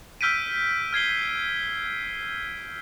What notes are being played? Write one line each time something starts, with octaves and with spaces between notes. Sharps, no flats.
E6 F6 G6 B6 D7 D#7
F6 G#6 C7 G7